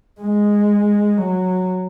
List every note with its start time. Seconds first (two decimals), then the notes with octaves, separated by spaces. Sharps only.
0.21 G#3
1.18 F#3